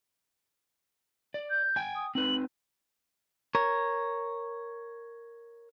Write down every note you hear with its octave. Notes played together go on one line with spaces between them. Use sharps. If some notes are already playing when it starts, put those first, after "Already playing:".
D5
G6
G5 G#5
D#6
C4 D#4 B4 F#7
A#4 C#5